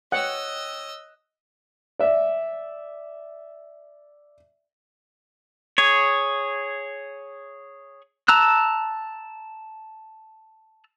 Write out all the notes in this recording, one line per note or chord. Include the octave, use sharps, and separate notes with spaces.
C#5 D#5 F#5 G5 E6 F#6
D5 E5
G#4 C#5
A5 A#5 E6 F#6